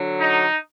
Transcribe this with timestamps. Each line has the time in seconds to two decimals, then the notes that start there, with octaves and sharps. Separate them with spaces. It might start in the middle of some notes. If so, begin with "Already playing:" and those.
Already playing: D3 F#3
0.20 D#4